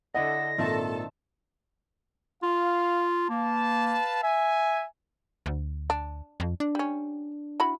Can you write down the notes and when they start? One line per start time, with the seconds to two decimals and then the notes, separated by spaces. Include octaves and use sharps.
0.14 D3 E4 A4 D#5 F#5 A#6
0.58 G#1 A#2 D#3 C4 A4 E5 A5
2.43 F4 F5
3.30 A#3 B4 F5 A5
4.23 E5 G#5
5.46 D2
5.90 D4
6.40 F2
6.60 D4
6.75 G3 C#4
7.60 E4 F#4 B5